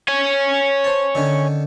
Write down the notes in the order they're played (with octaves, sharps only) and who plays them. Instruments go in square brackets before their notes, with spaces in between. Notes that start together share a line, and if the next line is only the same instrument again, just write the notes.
[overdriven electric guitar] C#5 G#5
[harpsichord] C5 A5
D3 D#3 C#4